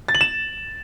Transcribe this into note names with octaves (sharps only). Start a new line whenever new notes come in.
A6
F#7
E7